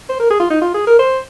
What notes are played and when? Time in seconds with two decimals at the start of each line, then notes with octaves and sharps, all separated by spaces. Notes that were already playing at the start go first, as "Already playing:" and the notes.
0.09 C5
0.19 A#4
0.30 G#4
0.39 F4
0.50 D#4
0.62 F4
0.74 G#4
0.87 A#4
0.99 C5